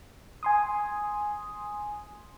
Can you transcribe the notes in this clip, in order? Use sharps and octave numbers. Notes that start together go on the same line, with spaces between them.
G#5 C6 D#6